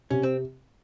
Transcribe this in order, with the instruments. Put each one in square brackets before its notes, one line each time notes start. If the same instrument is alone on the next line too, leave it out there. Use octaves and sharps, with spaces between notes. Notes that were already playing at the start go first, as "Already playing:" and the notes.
[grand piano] C3 [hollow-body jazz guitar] C#4
[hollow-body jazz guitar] C4